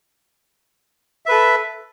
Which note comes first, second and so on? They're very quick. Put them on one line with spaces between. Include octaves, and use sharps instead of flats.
E5 B4 A4